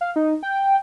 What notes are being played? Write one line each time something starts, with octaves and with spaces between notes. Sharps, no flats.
F5
D#4
G5